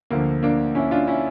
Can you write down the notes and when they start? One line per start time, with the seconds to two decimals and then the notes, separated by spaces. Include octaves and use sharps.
0.10 D2 D3 F3 A#3
0.43 A#3 D4
0.75 C#4 E4
0.91 D4 F4
1.07 C#4 E4